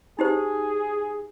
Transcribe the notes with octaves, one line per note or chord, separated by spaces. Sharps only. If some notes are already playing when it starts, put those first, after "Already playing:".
D#4 G4 G#4 C5